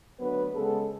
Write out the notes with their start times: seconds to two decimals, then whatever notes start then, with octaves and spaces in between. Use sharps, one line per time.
0.20 D2 D3 F#3 B3 B4
0.54 C#3 G#3 B3 A4